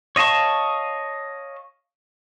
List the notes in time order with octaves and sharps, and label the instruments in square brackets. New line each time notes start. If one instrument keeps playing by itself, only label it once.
[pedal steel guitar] C#5 D#5 F5 A5 C#6